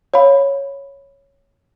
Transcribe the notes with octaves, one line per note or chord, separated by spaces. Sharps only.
C#5 F5 B5